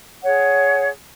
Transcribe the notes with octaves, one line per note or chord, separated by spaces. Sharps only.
G#4 C#5 F#5